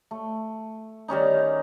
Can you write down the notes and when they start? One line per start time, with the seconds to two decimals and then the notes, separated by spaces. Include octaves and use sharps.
0.11 A3
1.08 D#3 G3 C#4 D#4